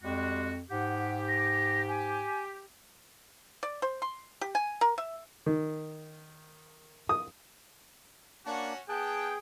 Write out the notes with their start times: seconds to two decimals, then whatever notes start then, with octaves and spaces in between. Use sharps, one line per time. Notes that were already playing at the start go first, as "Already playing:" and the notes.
0.03 F2 G3 G#3 F#4
0.70 G#2 G4 F#5
1.28 A#6
1.88 G#5
3.63 D5
3.82 C5
4.02 C6
4.41 G4
4.55 G#5
4.81 A#4
4.98 E5
5.46 D#3
7.09 D#6
8.46 A#3 C#4 D4 F#4 F#5 A5
8.89 B3 G#4 G5 A5 F#6